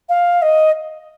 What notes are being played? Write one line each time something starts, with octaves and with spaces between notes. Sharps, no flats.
F5
D#5